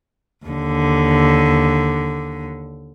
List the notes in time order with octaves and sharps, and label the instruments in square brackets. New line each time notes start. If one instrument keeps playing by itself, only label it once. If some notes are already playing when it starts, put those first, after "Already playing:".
[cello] D#2 D3